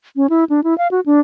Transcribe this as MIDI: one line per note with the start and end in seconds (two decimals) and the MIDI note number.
0.16 0.27 61
0.30 0.44 64
0.50 0.61 62
0.64 0.76 64
0.78 0.88 77
0.91 1.00 66
1.06 1.20 62